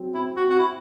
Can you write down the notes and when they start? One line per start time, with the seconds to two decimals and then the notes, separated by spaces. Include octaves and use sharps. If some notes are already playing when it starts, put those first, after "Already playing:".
Already playing: F#3 C4
0.14 C4 E4
0.37 F#4
0.44 C4
0.50 F#4
0.59 E4